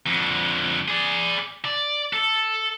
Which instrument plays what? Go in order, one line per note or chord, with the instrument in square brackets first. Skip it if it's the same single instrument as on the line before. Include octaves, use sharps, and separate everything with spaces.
[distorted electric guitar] F2 D3
G#4 D5
D5
A4